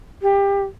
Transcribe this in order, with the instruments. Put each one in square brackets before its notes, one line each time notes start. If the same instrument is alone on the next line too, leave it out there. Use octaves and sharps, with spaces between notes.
[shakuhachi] G4